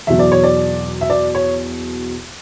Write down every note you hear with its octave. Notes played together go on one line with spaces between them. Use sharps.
E2 B2 F#3 E5
D5
C#5
D5
E5
D5
C#5